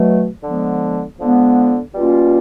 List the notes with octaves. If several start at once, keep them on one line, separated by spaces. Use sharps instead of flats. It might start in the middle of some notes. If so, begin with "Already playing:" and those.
Already playing: B2 F#3 A3
D3 F3 G#3 B3
D3 F3 G#3 B3
B2 G3 A#3 C#4 F4